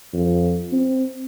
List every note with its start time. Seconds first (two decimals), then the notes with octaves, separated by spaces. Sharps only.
0.13 F2
0.72 C4